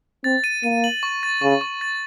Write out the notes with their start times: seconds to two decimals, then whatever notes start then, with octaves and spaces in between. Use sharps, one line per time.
0.24 C4 A6
0.44 D#7
0.63 A#3 D#7
0.84 F#7
1.03 C#6
1.23 A6
1.42 C#3 C#6
1.61 C#6
1.81 A6